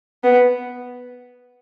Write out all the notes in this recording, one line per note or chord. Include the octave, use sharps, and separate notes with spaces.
B3